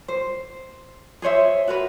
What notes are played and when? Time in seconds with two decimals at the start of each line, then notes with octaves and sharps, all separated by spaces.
0.08 C5
1.22 G#4 C5 C#5 E5
1.68 F#4 A#4 B4